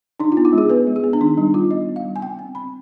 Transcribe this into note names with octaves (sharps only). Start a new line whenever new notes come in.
D4 D#4
F4
B3
F4
G#3
G#4
B3 B4
G#3
G#4
B3
D4
D#3 D#4
G3 D4
G3 F4
B3 D#5
B3
F5
G3
G#5
C4 G5
C4 G#5
C4 B5